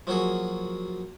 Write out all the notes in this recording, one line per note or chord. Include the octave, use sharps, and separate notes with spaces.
F3 F#3 A#3 F#4 G#4